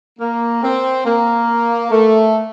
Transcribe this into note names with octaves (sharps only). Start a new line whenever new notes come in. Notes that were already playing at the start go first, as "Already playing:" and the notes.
A#3
C4
A#3
A3